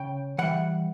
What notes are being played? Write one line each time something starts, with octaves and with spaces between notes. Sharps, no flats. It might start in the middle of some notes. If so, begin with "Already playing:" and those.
Already playing: C#3 G5
E3 G3 F#5